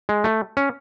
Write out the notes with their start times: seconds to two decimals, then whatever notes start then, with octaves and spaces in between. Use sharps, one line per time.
0.09 G#3
0.24 A3
0.57 C#4